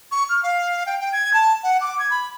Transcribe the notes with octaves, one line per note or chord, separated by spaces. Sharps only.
C#6
F6
F5
G5
G5
G#6
A5
F#5
D6
G#6
B5